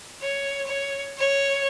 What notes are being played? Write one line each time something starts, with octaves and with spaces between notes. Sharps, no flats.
C#5
C#5
C#5